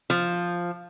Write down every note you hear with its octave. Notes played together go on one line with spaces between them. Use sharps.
F3